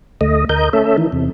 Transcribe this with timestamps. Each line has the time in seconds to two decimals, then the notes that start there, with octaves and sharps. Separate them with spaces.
0.21 D2 A3 D#5
0.49 D2 A#4 D#5 G6
0.73 A3 C#4 A4 E5
0.97 D#3 E3
1.12 E2 C3